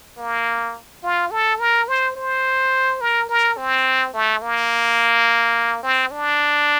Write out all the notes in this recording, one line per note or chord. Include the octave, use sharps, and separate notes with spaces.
A#3
F4
A4
A#4
C5
C5
A#4
A#4
C4
A3
A#3
C4
D4